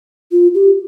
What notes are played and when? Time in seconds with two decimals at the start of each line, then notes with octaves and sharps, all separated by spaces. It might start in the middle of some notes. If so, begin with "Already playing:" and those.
0.32 F4
0.55 G4